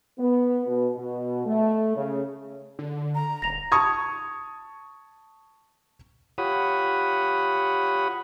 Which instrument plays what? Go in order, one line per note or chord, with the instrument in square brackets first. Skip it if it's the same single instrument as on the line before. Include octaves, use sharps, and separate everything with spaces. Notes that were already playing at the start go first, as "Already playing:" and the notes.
[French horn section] B3
B2
B2
A3
C#3
[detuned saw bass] D3
[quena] A#5
[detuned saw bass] D#1 [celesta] A#6 F7
[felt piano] A5 C#6 D#6 G#6
[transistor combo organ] F4 G4 C#5 F#5 B5 D#6